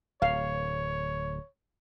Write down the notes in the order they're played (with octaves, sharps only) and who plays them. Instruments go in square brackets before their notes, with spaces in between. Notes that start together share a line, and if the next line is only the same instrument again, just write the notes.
[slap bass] D1 [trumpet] C#5 [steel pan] F5